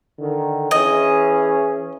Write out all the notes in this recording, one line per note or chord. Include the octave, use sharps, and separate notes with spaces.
D3 D#3
E3 C#4 G#4 D#5